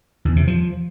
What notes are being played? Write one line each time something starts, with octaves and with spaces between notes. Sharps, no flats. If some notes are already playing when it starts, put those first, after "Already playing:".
E2
C3
F3